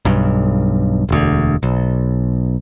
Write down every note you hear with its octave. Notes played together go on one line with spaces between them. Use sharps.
B1 G2
E1 D2
B1